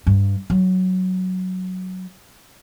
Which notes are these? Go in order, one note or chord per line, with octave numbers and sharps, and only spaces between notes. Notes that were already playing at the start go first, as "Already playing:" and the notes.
G2
F#3